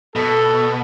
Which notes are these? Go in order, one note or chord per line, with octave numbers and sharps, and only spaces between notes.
B2 A4